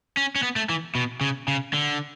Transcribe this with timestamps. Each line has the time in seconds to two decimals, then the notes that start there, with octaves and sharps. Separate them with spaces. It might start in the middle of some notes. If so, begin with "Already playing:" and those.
0.17 C#4
0.36 C#4
0.43 B3
0.56 A3
0.69 E3
0.95 B2
1.21 C#3
1.48 C#3
1.73 D3